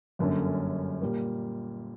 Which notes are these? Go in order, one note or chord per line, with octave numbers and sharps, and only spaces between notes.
G1 F#2 D3 A#3 C#4
A#2 G3 A#3